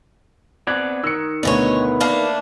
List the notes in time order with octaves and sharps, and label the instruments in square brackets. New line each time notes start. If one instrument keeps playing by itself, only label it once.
[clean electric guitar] B3 C4 D5 [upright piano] F#6 G#6
[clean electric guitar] D#3 [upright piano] E6 C#7
[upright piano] D2 B2 [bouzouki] D4 D#4 C#5 [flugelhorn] B4
[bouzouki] A3 A#3 D4 [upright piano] F5